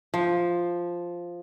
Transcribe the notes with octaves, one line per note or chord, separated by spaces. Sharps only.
F3